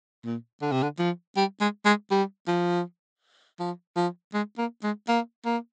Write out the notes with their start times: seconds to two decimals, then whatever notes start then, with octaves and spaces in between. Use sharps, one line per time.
0.25 A#2
0.62 D3
0.72 C3
0.83 D3
0.99 F3
1.37 G3
1.60 G#3
1.85 G#3
2.11 G3
2.48 F3
3.60 F3
3.96 F3
4.34 G#3
4.58 A#3
4.84 G#3
5.08 A#3
5.45 A#3